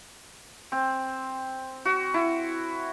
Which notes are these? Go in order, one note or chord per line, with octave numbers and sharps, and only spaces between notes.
C4
F#4
E4